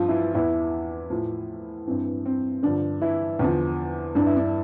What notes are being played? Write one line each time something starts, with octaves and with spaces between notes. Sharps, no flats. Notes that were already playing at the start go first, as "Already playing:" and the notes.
Already playing: G2 F3 F4
E3 E4
E2 E3 E4
A2 F3
G2 E3 C4
C4
G2 D3 F3 D4
E3 E4
E2 D3 F3
G2 E3 D4
E4
D4